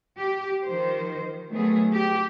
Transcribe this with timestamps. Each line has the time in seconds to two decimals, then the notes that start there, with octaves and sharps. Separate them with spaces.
0.19 G4
0.65 D#3 F3 C5
1.50 D#3 F#3 A3 B3 G#4
1.94 G4